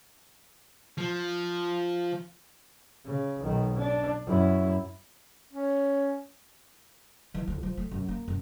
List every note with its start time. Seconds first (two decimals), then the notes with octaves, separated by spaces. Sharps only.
0.98 F3
3.05 C#3
3.43 B1 D#3
3.77 D4
4.26 F#2 E4
5.53 C#4
7.34 E3
7.47 D2
7.63 F3
7.77 A3
7.91 F#2
8.08 A#3
8.28 F#2